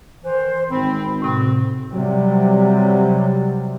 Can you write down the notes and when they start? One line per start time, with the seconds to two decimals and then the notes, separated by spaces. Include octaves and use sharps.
0.24 D#3 E3 C5
0.71 G#1 C4 B5
1.22 A2 C3 C4 F#4
1.92 C3 F#3 G3